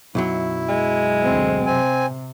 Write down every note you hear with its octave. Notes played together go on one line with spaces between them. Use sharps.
B1 F#2 F#3 E4
G#3
D2 C4
C3 C4 G#5